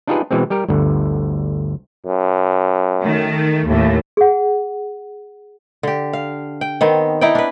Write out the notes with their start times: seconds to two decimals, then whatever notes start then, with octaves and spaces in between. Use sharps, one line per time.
0.07 D4 D#4 F4 G4 G#4 B4
0.31 B2 E3 G#3 C4
0.50 G3 G4 A#4
0.68 G1 D2 D3
2.06 F#2
3.03 D#3 A3
3.67 D#2 A2 A3
4.17 G#4 F#5
5.83 D3 G4
6.13 F5
6.61 G5
6.81 D#3 B3 C4
7.21 D#4 E4 D5 G5
7.35 D4 B4